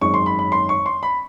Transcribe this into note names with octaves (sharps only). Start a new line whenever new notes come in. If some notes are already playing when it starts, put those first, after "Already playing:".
G#1 F#2 D#3 G#3 C#6
C6
B5
B5
C6
C#6
C6
B5